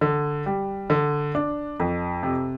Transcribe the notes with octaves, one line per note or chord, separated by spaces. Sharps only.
D3
G3
D3
D4
F2
C3